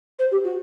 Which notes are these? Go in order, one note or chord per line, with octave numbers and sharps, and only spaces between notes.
C5
G4
F#4